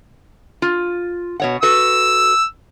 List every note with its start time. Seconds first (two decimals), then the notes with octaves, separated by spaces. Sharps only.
0.62 F4
1.40 B2 C#5 F#5
1.63 F#4 A4 B4 E6